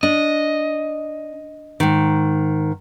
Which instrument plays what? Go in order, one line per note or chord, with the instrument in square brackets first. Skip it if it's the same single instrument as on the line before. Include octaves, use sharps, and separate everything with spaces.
[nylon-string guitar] D4 [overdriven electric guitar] D#5
[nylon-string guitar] G#2 D#3